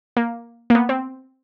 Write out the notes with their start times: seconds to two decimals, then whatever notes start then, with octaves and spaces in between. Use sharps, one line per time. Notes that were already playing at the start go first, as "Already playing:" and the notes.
0.17 A#3
0.70 A#3
0.75 B3
0.89 C4